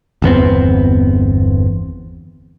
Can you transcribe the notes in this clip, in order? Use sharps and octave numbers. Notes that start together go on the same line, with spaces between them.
G1 E2 B3 C4